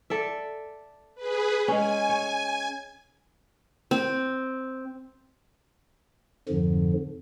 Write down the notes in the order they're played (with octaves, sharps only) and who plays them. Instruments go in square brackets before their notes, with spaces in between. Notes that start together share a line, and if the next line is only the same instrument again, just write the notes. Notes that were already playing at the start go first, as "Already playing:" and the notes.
[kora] A4 D5 E5
[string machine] G#4 B4
[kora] G#3 C#4 [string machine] G#5
[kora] C#5
[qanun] C4
[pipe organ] F2 G#2 D3 F3